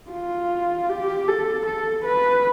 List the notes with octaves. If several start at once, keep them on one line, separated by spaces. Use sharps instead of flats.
F4
G4
A4
A4
B4